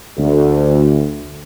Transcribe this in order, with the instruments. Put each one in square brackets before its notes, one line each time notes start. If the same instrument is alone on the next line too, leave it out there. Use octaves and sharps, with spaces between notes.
[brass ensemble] D2